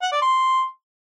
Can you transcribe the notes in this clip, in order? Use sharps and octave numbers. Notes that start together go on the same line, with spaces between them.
F#5
D5
C6